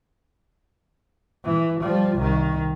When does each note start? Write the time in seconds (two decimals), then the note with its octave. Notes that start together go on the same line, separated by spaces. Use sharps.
1.44 E3
1.81 F3 G3
2.17 C2 D#3